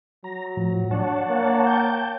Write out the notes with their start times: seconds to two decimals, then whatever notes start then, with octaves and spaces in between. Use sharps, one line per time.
0.24 F#3 A#5
0.57 A2 F3
0.91 D4 C#5 F#5 A5
1.29 A#3
1.67 G5 A5 G6